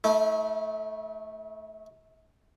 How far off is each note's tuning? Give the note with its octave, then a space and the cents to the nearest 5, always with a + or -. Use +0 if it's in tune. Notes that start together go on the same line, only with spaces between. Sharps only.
A3 +0 E4 -45